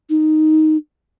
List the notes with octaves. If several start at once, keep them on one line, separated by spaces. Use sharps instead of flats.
D#4